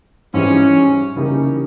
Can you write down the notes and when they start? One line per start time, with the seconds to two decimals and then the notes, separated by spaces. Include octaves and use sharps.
0.34 G#2 E3 G3 C#4
1.16 C#3 E3 G3 A#3 D#4